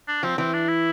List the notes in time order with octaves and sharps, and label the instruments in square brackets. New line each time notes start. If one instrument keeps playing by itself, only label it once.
[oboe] D4
[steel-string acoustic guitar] F3 [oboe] C4
[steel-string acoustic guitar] E3 [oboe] C4
[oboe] D4
E4